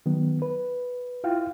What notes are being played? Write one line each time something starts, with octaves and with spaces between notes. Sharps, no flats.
D#3 F#3 B3
B4
E4 F4 F5 G5